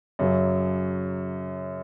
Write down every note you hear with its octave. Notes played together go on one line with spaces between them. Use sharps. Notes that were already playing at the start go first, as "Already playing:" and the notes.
F#2 C#3 F#3